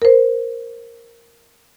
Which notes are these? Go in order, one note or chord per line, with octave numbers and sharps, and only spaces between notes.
A#4 C5